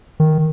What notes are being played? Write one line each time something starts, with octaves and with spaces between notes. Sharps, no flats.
D#3